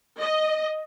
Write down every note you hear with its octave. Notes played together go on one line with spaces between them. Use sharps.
D#5